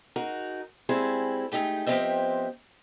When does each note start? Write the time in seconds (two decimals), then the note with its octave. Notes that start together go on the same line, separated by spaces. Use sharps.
0.16 D#4 F#4 G#4 A#4
0.89 G3 G#3 C4 E4 G#4
1.52 G#3 A3 D#4 G4 G#4
1.86 F3 B3 C4 G4 D#5 E5